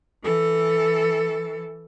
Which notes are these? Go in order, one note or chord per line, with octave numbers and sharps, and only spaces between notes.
E3 A4